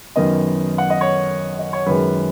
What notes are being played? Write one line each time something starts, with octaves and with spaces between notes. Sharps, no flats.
F#2 D#3 B3 D#5
F#5
D#5
C#5
D#5
C#5
F#2 D#3 G#3 B4